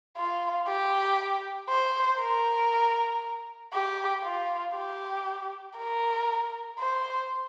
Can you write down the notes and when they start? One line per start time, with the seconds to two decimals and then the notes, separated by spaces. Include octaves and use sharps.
0.17 F4
0.67 G4
1.69 C5
2.19 A#4
3.73 G4
4.23 F4
4.75 G4
5.76 A#4
6.79 C5